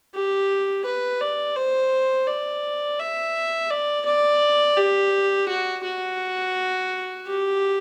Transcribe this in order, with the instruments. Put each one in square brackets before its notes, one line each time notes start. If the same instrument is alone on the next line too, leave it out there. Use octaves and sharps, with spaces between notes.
[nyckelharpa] G4
B4
D5
C5
D5
E5
D5
D5
G4
F#4
F#4
G4